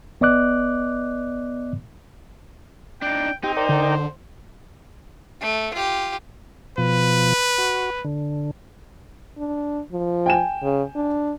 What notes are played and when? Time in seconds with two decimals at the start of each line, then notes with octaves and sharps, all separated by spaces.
0.21 G1 B3 D5 D#5 D6 F#6
3.02 D4 D#4 G5
3.44 C4 D#4 G4 G5
3.57 A#4 C5 D5 G5
3.69 D3
5.41 A3
5.73 F4 G4
6.78 B2 F3 B4
7.58 F#4
8.05 D3
9.38 D4
9.92 F3
10.26 G5 G#5 E7
10.63 C#3
10.95 D4